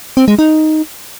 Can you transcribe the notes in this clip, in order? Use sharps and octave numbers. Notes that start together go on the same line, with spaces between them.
C4
G#3
D#4